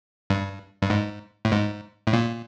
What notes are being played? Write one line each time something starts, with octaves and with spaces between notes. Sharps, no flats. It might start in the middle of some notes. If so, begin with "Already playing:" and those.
G2
G2
G#2
A2
G#2
A2
A#2